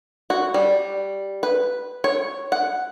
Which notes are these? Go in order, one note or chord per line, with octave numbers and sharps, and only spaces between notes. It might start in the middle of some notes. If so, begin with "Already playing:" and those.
F#4
G3
B4
C#5
F#5